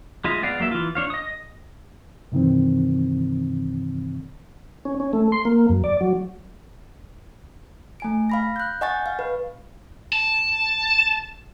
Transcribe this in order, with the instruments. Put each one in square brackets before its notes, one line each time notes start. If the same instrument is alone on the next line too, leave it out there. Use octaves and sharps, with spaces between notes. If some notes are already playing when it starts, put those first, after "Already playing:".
[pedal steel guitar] G#3 F4 D#5 E5
G#3 B3 D5 F5
F#3 A#3 E5
E3 F4
D4 C#5 F5
D#5 D#6
[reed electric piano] G2 C3 D#3 E3 C4
[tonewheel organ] C#4
C#4
A3
C6
A#3
F#2
D5
F#3
[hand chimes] A3 G#5 D7
F5 B5 A#6
F#6 G6
D#5 F#5 G#5 C#6 G6 A6
F5
B4
[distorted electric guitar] A5